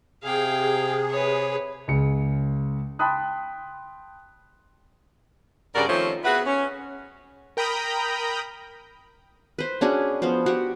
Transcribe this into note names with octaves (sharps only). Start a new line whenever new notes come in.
C3 G#4 F5 G5
B4 C#5
C#2 C#3 C#7
G5 A5 B5 C6 D#6 F#6
G2 C#3 F#4 A#4 D5
D#3 F3 A3 C4 C#4
B3 F#4 G#4 B4 E5 F#5
C#4
A#4 G5 A#5 B5 D#6 G6
B4 C5
C#4 D4 F#4 G#4
F3 B3 F#4 C5
F#4 G4